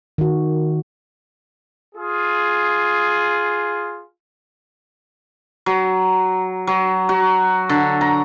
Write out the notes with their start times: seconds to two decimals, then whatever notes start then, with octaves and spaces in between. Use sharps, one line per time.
0.18 D#3 F#4
1.95 F4 G#4
5.66 F#3
6.67 F#3
7.09 F#4
7.69 D3
8.01 A#5